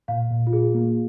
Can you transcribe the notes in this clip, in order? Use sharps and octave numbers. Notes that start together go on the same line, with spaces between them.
A#2 F5
A#2
F4
A#2 G#4
A#3